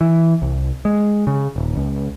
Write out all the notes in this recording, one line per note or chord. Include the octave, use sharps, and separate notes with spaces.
E3
C2
G#3
C#3
D#1
C#2